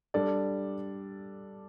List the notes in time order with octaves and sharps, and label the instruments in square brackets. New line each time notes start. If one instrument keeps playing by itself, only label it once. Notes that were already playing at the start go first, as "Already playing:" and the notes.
[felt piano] G3 D4 A4 D5